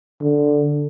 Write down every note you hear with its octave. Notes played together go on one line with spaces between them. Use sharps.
D3